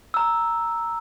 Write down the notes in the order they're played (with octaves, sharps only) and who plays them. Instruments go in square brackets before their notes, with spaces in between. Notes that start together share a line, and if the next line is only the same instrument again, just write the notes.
[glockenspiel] A#5 E6